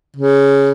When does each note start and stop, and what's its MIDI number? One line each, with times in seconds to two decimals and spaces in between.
0.16 0.72 49